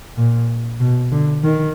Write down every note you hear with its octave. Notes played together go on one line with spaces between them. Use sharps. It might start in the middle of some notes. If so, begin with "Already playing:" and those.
A#2
B2
D3
D#3